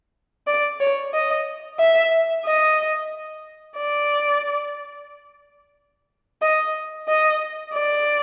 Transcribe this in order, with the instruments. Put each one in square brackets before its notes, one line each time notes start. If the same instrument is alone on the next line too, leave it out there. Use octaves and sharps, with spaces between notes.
[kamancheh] D5
C#5
D#5
E5
D#5
D5
D#5
D#5
D5